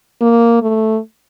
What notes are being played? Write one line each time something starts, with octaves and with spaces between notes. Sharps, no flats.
A#3
A3